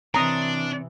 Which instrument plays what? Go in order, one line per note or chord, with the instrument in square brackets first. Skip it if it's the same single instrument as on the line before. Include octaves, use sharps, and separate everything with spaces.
[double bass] C3 E3 [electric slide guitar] C4 C#5 [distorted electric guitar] D4 [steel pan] A#5 D#6